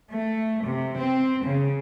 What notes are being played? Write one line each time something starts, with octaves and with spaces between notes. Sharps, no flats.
A3
C3
C4
C#3